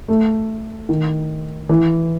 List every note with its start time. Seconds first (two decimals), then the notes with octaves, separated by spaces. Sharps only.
0.08 A3
0.89 D#3
1.69 E3